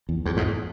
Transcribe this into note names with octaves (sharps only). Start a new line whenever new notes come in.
E2
E2
E2 G#2